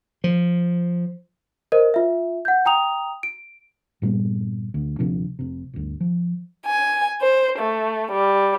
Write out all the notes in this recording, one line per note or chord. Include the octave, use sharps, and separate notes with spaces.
F3
A#4 C5 D#5
F4 E5
F#5 G6
G5 A#5 D#6 F7
D7
G2 A#2 G3 B3
D2
D#1 C3 F3 D4
F1 C3
G1 D2
F3
G#5
C5
A3
G3